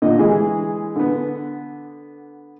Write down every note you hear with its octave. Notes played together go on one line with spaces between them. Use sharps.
A#2 D3 D#5
E3 G#3 G#4
D3 B3